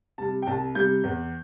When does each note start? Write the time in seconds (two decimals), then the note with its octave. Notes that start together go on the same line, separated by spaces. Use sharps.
0.18 C3 G3 A5
0.42 G5
0.47 C2 A5
0.75 C3 G3 G6
1.04 E2